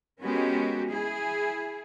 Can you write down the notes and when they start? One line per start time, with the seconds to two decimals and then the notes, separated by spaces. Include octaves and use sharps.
0.22 G#3 B3 C#4 F#4 G4 A#4
0.89 E4 G#4